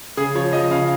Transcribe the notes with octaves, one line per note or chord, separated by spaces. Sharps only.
C#3 G#4
F3 C#5
F3 D#5
C#3 F5